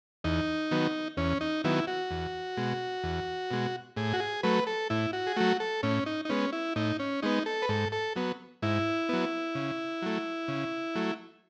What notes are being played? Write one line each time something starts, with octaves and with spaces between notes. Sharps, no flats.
E2 D#4
D#3 F#3 B3
E2 C#4
D#4
D#3 F#3 B3 E4
F#4
E2
B2 G#3
E2
B2 G#3
A2 G#4
F#4
G#4
F#3 A3 B4
A4
A2 E4
F#4
G#4
F#3 A3 F#4
A4
A2 C#4
D#4
D#4
G#3 B3 C#4
E4
A2 D#4
C#4
G#3 B3 D#4
A4
B4
G#2 A4
A4
F#3 B3
G#2 E4
F#3 B3
C#3
F#3 A3
C#3
F#3 A3